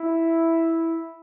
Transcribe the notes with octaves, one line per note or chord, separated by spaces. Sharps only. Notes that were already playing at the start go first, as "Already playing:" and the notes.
Already playing: E4